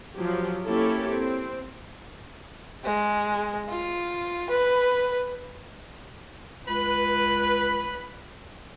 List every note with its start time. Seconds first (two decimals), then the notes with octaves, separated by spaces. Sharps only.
0.16 F3 F#3 G4
0.66 A#3 C#4 E4 G4 A4 C#5
1.11 C4
2.84 G#3
3.69 F4
4.50 B4
6.68 C#2 B4 B5